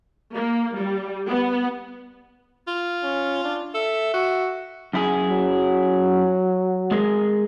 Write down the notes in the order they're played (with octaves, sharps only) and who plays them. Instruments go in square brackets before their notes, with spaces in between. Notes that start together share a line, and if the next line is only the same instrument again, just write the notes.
[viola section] A#3
G3
B3
[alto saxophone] F4
[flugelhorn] C#4
D4
[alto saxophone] A4 [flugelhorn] E5
[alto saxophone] F#4
[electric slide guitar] F#2 E4 G#4
[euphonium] F#3
[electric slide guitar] G#3 G#4 A#4